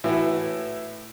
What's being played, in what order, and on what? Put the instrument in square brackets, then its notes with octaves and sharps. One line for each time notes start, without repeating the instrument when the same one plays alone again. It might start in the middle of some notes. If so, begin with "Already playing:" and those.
[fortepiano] A2 E3 F#4